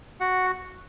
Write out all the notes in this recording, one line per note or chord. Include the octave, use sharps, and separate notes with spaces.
F#4 F#5